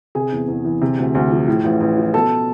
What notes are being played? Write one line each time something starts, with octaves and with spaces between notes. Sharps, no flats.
C3 G#4 G#5
E2
E2
E3
C3
D2
D2
F3
A2
A1
A1
F3
B2 A4 A5